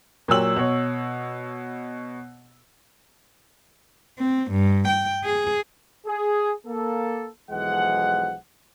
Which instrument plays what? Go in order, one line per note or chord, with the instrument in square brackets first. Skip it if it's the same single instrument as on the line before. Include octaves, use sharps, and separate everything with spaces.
[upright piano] A#2 F#3 G4 E6 F#7
B2 C#5
[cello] C4
G2
G5
G#4
[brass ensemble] G#4
A#3 A4
B1 E3 F3 G#3 F#5